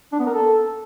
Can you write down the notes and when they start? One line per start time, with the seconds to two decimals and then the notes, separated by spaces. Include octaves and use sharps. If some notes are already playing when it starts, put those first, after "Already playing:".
0.12 D4
0.19 B3
0.26 A#4
0.33 A4